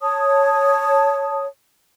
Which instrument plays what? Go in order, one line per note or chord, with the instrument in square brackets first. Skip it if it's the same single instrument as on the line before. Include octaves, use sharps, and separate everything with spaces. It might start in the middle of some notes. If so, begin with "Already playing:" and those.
[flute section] C#5 A5 D#6